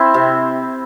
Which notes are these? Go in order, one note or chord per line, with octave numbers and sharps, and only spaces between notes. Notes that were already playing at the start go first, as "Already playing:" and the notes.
Already playing: C4 E4
C3